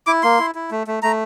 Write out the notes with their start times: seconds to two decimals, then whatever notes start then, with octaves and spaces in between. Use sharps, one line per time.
0.07 E4 D6
0.23 A#3 C6
0.39 E4
0.55 E4
0.71 A3
0.87 A3
1.02 A3 A#5